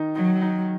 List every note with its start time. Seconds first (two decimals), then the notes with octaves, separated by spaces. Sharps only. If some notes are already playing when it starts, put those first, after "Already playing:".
Already playing: D#3 D#4
0.16 F#3 D#4
0.42 D#4